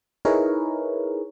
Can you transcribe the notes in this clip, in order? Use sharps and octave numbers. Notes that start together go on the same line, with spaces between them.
D#4 E4 G#4 A#4 B4 C#5